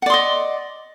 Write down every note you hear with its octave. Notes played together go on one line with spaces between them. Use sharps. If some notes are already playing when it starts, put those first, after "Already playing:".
D5 D#5 F#5 C6